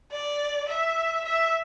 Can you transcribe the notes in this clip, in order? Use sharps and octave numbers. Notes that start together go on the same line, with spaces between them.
D5
E5
E5